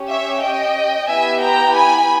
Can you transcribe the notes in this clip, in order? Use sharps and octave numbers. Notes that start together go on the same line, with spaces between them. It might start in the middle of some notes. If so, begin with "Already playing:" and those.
Already playing: C#4 G4
C#5 E5
D#5 G5
B3 E4 G4 E5 G#5
G5 A#5
G#5 B5